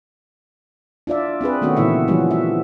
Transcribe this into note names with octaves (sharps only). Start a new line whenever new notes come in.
D4 F4 D5 E5
C4 D4 G#4 B4
D#3 A3 B3 C#4 F#4
A#2 C#3 E3 E4 E5
E3 F3 G3 C#4 F#4
E5